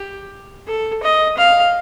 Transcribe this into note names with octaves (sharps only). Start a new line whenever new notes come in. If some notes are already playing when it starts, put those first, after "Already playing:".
Already playing: G4
A4
D#5
F5